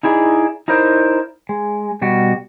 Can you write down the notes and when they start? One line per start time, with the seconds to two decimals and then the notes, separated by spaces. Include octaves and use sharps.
0.03 D#4 E4 G#4 D5
0.68 D#4 E4 A#4 C5 D5
1.49 G#3
2.02 B2 G3 F#4